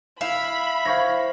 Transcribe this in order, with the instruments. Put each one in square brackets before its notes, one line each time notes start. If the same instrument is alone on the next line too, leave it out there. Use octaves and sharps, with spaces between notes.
[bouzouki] E4 [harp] F5 [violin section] B5
[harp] C5 C#5 [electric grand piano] F5 C#6 A#6